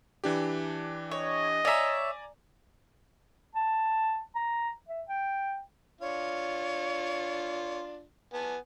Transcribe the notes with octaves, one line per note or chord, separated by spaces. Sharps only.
E3 D4 G4
C#5 D#5
C#5 D5 E5 G#5 A#5
A5
A#5
E5
G5
D4 F4 C#5
B3 G#5 A5